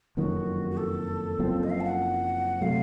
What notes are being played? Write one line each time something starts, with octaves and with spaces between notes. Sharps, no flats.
F#1 F2 D#3 F#3 F#4
F#4
A4
F#1 F#2 F3 C4
D#5
F5
A5
F#5
C3 F#3 A3 F5